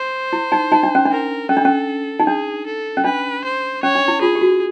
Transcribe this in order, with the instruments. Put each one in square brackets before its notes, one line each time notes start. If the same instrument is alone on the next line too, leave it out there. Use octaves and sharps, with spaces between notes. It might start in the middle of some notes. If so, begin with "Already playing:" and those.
Already playing: [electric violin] C5
[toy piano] E4
D#4
D#4
D4
C#4
D4
[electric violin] A#4
[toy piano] C#4 [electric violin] A4
[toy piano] D4
C#4
D#4
[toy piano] D4 [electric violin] G#4
[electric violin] A4
[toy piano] C#4
[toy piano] D4 [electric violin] B4
[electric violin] C5
[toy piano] C#4 [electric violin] C#5
[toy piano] D4
E4
[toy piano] F4 [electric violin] G#4
[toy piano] G4
F#4